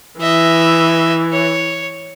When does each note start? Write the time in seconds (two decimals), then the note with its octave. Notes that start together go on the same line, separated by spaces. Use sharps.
0.21 E3 D#5 E5
1.33 C#5